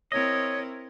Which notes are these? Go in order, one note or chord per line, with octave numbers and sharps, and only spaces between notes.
C4 E4 A#4 C#5 D#5